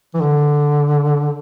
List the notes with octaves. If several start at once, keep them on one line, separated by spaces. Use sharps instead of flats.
E3
D3